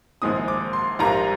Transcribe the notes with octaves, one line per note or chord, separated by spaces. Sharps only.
A#1 G#2 D#3 G#3 C4 D#6
D6
C6
A#1 G#2 G3 A#3 A#5